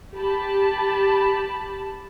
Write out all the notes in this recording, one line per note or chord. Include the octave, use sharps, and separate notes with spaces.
G4 A5 B5